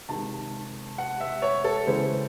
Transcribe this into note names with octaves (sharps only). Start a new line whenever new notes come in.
C3 D#3 G#3 A5
F#5
E5
C#5
A4
C#3 E3 G#3 C5